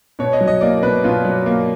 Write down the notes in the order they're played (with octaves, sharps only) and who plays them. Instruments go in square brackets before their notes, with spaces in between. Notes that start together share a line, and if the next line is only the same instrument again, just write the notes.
[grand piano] B2 C#5
D#5
F#3
D#5
A#3 D5
B2 B4
B2 F4
F#3
A#3